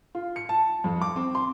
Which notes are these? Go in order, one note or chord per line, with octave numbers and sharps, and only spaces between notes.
F4
C#7
A5
F2
D6
C4
C6